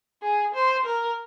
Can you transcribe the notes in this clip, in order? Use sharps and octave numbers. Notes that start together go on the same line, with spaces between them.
G#4
C5
A#4